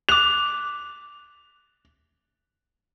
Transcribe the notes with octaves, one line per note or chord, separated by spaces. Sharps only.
D6 F#6 F7